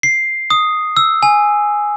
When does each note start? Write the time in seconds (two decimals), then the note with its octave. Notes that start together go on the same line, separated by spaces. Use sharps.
0.03 C7
0.50 D#6
0.97 E6
1.23 G#5